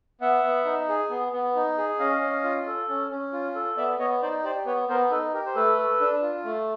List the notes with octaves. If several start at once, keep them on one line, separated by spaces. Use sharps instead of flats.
B3 E5 F#5
B3
D#4
G#4
B3
B3
D#4
G#4
C#4 D#5 F5
C#4
F4
A4
C#4
C#4
F4
A4
B3 D5 E5
B3 C#5 D#5
D#4 C5 D5
G4 C5 D5
B3 B4 C#5
B3 A#4 C5
D#4 A4 B4
G4 A#4
C5
A3 A4 B4
A4
D4
F4
A3